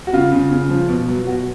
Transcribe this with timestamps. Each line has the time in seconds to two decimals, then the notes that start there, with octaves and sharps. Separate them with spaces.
0.07 F#4
0.13 C#3 F4
0.32 C#3
0.51 C#3
0.70 F3
0.88 B2
1.08 F#3
1.27 B2 F#4